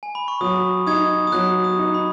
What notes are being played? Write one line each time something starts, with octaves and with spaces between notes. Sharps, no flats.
G#5
B5
C#6
F#3 D#6
D#4 D#6 G#6
D#6
F#3 F#6
D#6
D#4
B5